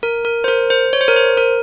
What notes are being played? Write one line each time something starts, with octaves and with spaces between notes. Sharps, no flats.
A#4
A#4
C5
A#4
C5
C#5
C5
A#4
C5
A#4